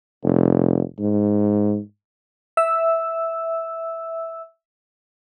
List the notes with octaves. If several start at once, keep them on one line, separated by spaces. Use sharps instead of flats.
F1
G#2
E5 E6